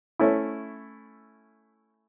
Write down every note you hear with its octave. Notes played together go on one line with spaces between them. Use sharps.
A3 C#4 E4